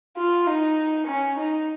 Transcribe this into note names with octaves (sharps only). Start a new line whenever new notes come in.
F4
D#4
C#4
D#4